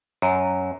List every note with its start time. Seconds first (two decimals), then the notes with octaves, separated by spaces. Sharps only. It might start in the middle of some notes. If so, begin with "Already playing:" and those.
0.22 F#2